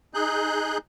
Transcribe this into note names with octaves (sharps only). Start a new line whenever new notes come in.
D#4 G#4 F#6 G6